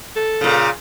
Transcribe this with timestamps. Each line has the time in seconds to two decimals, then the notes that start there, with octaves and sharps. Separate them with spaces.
0.16 A4
0.41 A#2 C#3